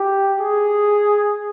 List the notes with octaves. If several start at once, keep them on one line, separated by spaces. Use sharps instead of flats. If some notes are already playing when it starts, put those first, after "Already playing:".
Already playing: G4
G#4